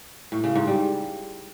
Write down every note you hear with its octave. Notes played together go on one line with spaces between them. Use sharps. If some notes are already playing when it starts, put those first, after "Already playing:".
A2
C#3
G#2
G3